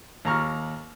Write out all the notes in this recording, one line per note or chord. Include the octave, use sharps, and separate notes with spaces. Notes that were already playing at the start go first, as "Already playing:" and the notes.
D#2 A#5 C#6 F6